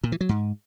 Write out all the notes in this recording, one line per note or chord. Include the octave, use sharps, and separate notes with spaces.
A#2
E3
F#3
G#2